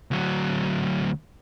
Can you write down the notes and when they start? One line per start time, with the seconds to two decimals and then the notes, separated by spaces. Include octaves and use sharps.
0.11 D2 F#3